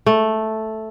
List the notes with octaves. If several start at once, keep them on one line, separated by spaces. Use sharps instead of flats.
A3